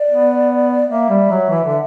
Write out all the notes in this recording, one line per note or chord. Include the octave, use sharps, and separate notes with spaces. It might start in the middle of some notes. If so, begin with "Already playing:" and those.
Already playing: D5
B3
A#3 E5
G3
F#3
E3
D3